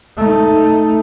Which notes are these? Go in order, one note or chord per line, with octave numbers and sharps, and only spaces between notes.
A3 D#4